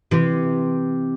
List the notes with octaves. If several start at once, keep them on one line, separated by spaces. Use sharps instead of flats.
C3 E3